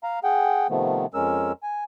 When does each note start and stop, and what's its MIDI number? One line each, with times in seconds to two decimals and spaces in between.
0.03 0.19 77
0.03 0.19 82
0.24 0.67 68
0.24 0.67 78
0.24 0.67 79
0.70 1.06 48
0.70 1.06 51
0.70 1.06 53
0.70 1.06 57
0.70 1.06 59
1.14 1.52 41
1.14 1.52 56
1.14 1.52 61
1.14 1.52 70
1.14 1.52 88
1.63 1.84 80